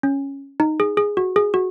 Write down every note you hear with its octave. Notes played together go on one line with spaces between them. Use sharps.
C#4
D#4
G#4
G#4
F#4
G#4
F#4